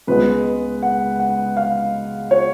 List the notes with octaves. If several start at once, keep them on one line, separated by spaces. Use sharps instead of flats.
C#2 C#3 G#3 B3 B4
F#5
F#5
F5
C#5